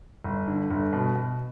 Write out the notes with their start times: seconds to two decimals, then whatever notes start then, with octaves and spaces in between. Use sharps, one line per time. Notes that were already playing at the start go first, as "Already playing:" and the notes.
0.24 G1
0.48 D3
0.70 G1
0.93 B2
1.16 B2